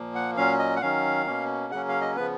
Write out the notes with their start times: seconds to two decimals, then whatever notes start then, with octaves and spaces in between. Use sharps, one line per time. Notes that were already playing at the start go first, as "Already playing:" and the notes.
Already playing: A#2 F3 A#3
0.15 F#5
0.37 A#2 F#3 C#4 F5
0.59 D#5
0.76 F#5
0.82 D#3 F#3 C#4 F5
1.26 B2 A#3 C#4
1.71 C#3 F#3 A#3 C#4 F#5
1.89 F5
2.01 D#5
2.16 C#3 F3 B3 B4